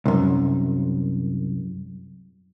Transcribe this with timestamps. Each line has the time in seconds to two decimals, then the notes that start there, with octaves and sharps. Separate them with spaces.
0.06 C2 F#2